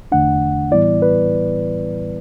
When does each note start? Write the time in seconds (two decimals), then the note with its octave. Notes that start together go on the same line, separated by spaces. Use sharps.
0.12 E2 D3 A3 D4 F#5
0.71 A2 E3 G3 B3 E4 D5
1.02 B4